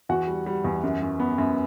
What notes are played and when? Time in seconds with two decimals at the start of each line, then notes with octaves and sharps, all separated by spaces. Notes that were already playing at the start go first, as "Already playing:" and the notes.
0.09 E2 F#4 F#5
0.28 G3
0.46 G3
0.64 E2
0.84 F#2
1.02 F#2
1.20 B3
1.38 F#2